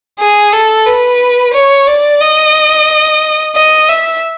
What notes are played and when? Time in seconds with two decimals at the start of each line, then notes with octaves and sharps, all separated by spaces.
0.19 G#4
0.53 A4
0.86 B4
1.54 C#5
1.87 D5
2.20 D#5
3.56 D#5
3.89 E5